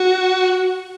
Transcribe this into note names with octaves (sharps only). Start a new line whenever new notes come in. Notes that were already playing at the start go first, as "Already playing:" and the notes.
Already playing: F#4